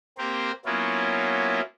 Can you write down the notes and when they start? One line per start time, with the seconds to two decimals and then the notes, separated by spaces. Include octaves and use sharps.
0.18 A#3 C4 G4 A#4 C5
0.65 F#3 A#3 B3 C#4 E4 F4